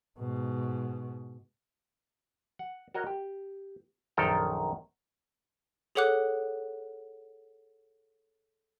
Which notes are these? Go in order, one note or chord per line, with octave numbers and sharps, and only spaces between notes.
G#2 B2
F#5
F#4 A#4 C#5 D#5
G4
A#1 F#2 D#3 A4 G5 A#5
G#4 A4 C#5 F#5 D6 F#6